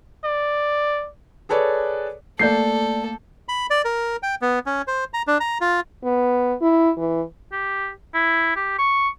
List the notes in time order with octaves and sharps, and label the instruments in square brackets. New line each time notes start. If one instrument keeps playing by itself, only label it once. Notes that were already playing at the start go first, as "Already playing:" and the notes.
[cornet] D5
[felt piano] G#4 A4 B4 C#5 D5
[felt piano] A3 A#3 [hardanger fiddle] A4 [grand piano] D5 G6 C7
[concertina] B5
D5
A#4
G5
B3
C#4
C5
A#5
D4
A#5
F4
[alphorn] B3
E4
E3
[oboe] G4
E4
G4
C#6